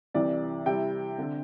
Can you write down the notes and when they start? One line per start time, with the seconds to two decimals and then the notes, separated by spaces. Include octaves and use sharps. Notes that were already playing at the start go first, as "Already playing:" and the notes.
0.14 C2 C3 E3 D5
0.66 C3 G3 C4 E4 G5
1.18 D3 C4